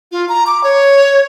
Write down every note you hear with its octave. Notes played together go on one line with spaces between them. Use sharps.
F4
A#5
D6
C#5